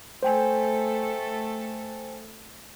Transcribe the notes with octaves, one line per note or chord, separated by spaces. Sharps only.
A3 A4 C5 G5 G#5